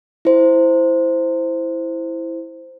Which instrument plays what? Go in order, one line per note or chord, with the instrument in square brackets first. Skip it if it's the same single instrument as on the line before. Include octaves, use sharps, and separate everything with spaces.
[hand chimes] E4 C5